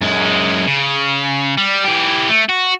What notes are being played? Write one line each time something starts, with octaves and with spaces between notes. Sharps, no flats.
F#2 G#3
C#3
G3
E3 G4
A3
F#4